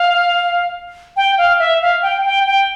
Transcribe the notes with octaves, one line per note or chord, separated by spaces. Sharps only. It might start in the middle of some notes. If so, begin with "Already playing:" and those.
Already playing: F5
G5
F5
E5
F5
G5
G5
G5